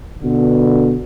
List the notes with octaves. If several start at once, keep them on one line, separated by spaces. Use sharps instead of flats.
B2 D3